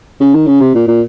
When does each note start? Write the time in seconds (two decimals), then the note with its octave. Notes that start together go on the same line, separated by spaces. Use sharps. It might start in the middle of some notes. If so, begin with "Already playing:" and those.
0.20 C#3
0.34 D#3
0.47 C#3
0.61 C3
0.75 A#2
0.88 A#2